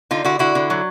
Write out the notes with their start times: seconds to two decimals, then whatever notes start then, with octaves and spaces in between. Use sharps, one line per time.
0.11 D3 D#4 F4
0.24 D3 E4 F#4
0.39 D3 E4 F#4
0.55 D3
0.70 F#3